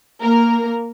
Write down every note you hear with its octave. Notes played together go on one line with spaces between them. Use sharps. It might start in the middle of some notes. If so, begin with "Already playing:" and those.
A#3 A#4